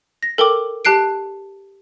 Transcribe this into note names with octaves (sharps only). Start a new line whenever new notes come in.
A#6
A4 A#4 G5 D6
G4 A5 F#6 C7 D7